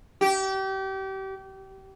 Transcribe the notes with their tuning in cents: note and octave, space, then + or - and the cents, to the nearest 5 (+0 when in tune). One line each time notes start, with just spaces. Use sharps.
G4 -30